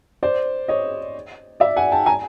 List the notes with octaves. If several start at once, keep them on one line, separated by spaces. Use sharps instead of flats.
C5 D5
C#5 D#5
D5 E5
F#5 G#5
G5 A5
G#5 A#5